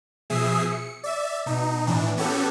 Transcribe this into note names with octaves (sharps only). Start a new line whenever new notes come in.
B2 F3 G#4 E5 D#6 C7
C#7
D5 E5 E7
B2 D#4
A2 E3 D4
B3 C#4 F#4 G4 A4